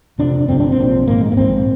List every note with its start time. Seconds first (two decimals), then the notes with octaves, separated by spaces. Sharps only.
0.19 F1 F2 C3 D4
0.48 G1 F2 C3 C4
0.60 D4
0.72 C4
0.78 A#1 A#2
1.08 G#1 G#2 A#3
1.21 G#3
1.32 A#3
1.36 A#1 G#2 C4